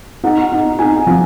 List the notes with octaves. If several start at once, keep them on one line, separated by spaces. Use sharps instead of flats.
D#4 F#5
D#4
D#4 G#5
F3